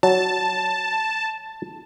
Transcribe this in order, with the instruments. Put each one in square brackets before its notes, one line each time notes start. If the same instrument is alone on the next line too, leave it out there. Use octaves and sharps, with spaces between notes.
[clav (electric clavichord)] F#3 [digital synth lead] A5